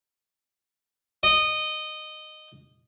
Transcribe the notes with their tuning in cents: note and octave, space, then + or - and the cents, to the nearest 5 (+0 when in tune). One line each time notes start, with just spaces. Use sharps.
D#5 -15